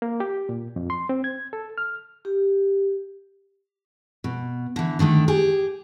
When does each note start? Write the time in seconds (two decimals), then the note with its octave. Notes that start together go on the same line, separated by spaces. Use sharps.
0.02 A#3
0.20 G4
0.49 A#2
0.76 F2
0.90 C6
1.09 C4
1.24 G#6
1.53 A4
1.78 F6
2.25 G4
4.24 B2
4.76 D3 E3
4.99 D3 D#3 A3 D4
5.28 G4 G#4